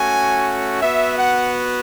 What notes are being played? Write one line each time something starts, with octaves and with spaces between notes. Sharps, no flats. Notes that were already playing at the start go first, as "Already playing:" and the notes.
Already playing: A3 C#4 F#4 G#5
B3 F#4 E5
F#5